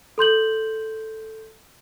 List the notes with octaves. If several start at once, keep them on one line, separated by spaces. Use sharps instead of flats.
A4 C6 G6 F#7